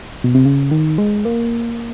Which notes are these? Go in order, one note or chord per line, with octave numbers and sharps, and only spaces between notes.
B2
C3
C#3
D#3
G#3
A#3